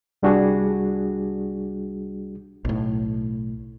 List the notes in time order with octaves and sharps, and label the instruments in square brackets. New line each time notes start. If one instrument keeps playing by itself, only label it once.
[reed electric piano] C2 G3 D4 F#4 G#4
[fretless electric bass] B1 A2